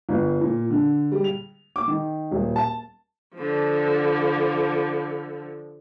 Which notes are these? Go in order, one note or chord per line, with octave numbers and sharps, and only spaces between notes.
G1
A#2
D3
G3
F7
D6
D#3
D#1
A5
D3 F3